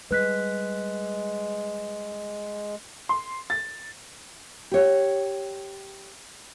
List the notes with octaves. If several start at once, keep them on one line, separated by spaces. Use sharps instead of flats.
G3 G#3 B4 F#6 B6
C6
A6
G4 C#5